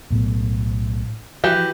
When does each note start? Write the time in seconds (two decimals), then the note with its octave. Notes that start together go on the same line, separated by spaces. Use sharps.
0.11 B1 A2 B3
1.44 E3 F3 F#4 G4